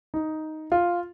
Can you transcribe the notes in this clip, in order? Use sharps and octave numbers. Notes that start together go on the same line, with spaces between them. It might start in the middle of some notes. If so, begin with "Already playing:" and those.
D#4
F4